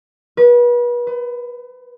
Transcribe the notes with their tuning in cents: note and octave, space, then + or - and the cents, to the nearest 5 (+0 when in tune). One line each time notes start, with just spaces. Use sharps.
B4 -35
B4 +35